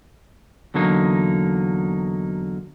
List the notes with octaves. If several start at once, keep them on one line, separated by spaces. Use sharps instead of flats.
E2 D3 F#3 A#3 D#4